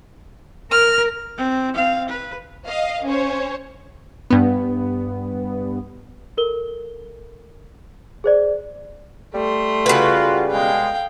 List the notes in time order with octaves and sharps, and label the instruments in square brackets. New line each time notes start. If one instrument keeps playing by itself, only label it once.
[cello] A#4 [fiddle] F6
[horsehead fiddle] C4
C4 F5
B4
[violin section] D#5 F5
C#4 C5 C#5
[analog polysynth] G2 B3
[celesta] A4 A#4 G7
G#4 C5 D5
[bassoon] G3 [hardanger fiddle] A3 C6
[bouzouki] C#3 B4 [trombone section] F4 F#4
[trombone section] B2 G#3 [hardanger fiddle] F5 G5